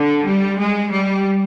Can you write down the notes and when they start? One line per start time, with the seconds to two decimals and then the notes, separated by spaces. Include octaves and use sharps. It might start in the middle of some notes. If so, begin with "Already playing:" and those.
Already playing: D3
0.25 G3
0.58 G#3
0.91 G3